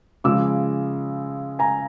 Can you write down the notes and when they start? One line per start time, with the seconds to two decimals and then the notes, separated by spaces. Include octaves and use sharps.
0.24 C#3 F3 G#3 D6 E6
1.59 G#5 A#5